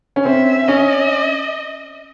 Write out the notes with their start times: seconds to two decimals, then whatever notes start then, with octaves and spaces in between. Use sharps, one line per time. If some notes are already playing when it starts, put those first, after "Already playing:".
0.16 C#4
0.25 C4 E5
0.67 C#4 D#5